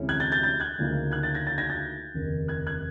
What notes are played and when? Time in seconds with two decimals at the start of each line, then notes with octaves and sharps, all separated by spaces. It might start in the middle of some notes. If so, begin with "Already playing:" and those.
Already playing: D2 C3 E3 G#3 C#4
0.09 F#6 G#6
0.20 G6 A6
0.32 G6 A6
0.43 G6 A6
0.60 F#6 G#6
0.78 D2 C#3 F3 A#3 D#4
1.11 F#6 G#6
1.23 G6 A6
1.34 G#6 A#6
1.46 G6 A6
1.58 G#6 A#6
1.69 G6 A6
2.14 F1 D#2 C#3
2.48 F#6 G#6
2.67 F#6 G#6